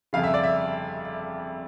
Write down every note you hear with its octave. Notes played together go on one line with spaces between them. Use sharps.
G1 F2 C#3 F5
E5
D5
E5